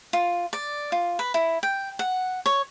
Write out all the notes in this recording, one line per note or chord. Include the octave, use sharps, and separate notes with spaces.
F4
D5
F4
B4
E4
G5
F#5
C#5